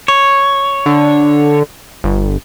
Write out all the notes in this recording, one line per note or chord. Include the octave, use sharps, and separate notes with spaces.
C#5
D3
G1